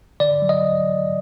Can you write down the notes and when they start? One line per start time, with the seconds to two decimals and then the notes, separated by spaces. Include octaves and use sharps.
0.20 D3 D5
0.42 F#3
0.49 D#5